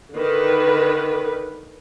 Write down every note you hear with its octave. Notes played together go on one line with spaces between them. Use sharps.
D3 D#3 B4